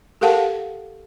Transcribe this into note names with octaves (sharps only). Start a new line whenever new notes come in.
G4 A4 A#4 F5 F#5 A5